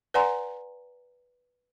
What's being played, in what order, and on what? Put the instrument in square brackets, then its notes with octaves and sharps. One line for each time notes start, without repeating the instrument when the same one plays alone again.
[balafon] B4 D5 F#5 G#5 A#5 C6